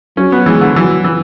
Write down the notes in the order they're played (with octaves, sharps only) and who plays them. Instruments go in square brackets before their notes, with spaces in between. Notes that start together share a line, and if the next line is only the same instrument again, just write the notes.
[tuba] F#3 [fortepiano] C#4
[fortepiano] B3
[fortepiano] E3 [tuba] G#3
[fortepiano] D3
[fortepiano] E3 [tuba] F#3
[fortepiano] E3